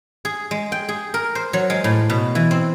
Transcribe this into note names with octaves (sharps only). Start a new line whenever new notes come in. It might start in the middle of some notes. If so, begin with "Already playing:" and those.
G#4
G#3
G5
G#4
A#4
C5
F#3
G#3
A2
B2
E3
C4